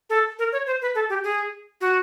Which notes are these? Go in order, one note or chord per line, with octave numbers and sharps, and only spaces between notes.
A4
A#4
C#5
C5
B4
A4
G4
G#4
F#4